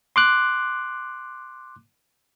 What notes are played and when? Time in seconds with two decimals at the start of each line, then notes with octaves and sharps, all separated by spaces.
0.16 C6 D6 F#6